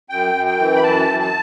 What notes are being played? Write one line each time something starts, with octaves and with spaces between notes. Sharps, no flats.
F#2 G5
F#2
G5
E3
B5
F#2 A5
F#2
A5